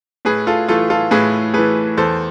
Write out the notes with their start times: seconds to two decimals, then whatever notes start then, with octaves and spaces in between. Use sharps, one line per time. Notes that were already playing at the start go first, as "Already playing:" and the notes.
0.25 A2 G#4 B4
0.47 F4 A4
0.68 E3 A3 F4 A4
0.90 F4 A4
1.11 A2 G#4 B4
1.54 E3 A3 G#4 B4
1.97 E2 A4 C5